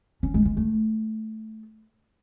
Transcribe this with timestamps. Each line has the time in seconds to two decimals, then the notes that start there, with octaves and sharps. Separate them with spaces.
0.23 C#4
0.34 G#3
0.45 G#3
0.57 A3